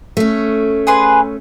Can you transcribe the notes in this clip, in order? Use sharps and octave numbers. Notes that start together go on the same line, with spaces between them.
A3 C#4
G#4 B4 C6